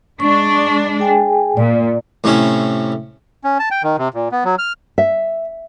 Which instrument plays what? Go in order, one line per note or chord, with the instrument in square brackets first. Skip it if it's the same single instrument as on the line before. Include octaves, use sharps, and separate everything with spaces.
[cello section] G#3 D4 [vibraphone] C#6
[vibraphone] G#4 G5 G#5
[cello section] A#2 [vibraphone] D5
[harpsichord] A2 C3 C#4 E4
[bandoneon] C#4
A5
G5
D#3
C3
A#2
B3
F#3
F6
[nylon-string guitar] E5